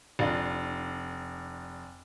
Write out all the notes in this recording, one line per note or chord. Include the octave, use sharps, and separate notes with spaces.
F1 D4 F4